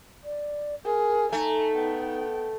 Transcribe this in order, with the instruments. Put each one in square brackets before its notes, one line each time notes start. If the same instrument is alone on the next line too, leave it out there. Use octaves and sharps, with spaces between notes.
[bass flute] D5
[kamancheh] G#4 [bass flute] A#4
[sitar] A3 [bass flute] D#4 [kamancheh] G#5 A#5
[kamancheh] B3 G5